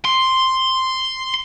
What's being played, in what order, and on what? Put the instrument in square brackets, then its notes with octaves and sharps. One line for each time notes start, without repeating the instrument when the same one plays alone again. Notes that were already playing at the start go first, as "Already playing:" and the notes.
[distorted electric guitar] C6